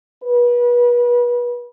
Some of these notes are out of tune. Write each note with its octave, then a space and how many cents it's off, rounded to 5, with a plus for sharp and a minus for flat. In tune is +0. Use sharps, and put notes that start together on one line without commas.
B4 -30